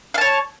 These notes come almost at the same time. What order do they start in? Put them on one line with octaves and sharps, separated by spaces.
F5 A5 C#5